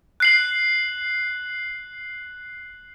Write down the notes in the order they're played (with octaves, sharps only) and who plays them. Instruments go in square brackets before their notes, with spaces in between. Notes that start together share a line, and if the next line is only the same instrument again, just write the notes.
[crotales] F#6 C7 F#7